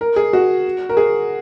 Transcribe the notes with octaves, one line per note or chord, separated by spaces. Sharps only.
A#4
G#4
F#4
A#4
G#4